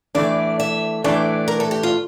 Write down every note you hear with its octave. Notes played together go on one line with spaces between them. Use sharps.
A2 E3 A3 D4 D5
E5
A2 E3 A3 D4 D5
A#4
A4
G4
F4